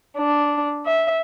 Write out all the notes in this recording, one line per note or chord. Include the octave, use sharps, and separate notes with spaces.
D4
E5